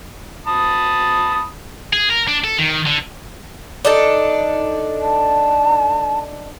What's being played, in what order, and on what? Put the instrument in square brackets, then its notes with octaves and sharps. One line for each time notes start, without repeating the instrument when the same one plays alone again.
[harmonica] A5 B5 D#6
[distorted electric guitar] G#4
A#4
D4
A4
D#3
D3
[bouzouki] D4 D#4 A4
[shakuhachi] A5